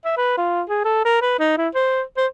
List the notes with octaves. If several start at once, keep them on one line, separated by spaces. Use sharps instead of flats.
E5
B4
F4
G#4
A4
A#4
B4
D#4
E4
C5
C5